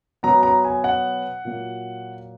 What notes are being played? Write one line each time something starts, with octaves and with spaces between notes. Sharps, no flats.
B2 F#3 B3 A#5
A#5
G#5
F#5
A#2 F#3 A#3